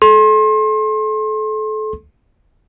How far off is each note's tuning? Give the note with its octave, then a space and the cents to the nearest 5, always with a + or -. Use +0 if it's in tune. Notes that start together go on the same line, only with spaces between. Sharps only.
A4 -30 C6 +35